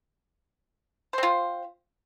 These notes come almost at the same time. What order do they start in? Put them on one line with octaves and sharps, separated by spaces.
C5 C4 F4